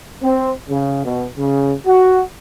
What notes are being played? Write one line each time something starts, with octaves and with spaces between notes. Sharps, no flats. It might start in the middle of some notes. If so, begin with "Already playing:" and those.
C4
C#3
B2
C#3
F#4